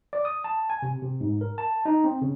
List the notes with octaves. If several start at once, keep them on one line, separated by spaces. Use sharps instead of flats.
D5
D#6
A5
G#5
C3
C3
G#2
A#4
A5
D#4
C4
C#3